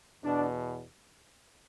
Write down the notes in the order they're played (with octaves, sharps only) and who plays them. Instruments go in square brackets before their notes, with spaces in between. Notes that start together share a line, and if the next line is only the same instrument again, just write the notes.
[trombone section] E2 B2 D4